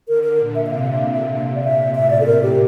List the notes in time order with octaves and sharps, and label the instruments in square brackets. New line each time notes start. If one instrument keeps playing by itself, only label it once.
[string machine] D3 [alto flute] A#4
[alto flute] A#4
[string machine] A#2
[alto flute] E5
E5
[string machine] C3 [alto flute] F5
[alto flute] E5
[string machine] C3
[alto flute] E5
[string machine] C3 [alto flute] F5
[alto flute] D5
[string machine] A#2 [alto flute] E5
[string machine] A2 [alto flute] E5
[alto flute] D5
A4
A#4
G4